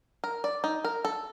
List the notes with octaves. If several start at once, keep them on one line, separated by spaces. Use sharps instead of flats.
A#4
D5
D#4
A#4
A4